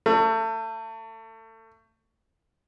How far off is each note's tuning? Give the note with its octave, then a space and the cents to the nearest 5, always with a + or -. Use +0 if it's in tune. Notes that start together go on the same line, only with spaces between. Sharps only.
A3 +30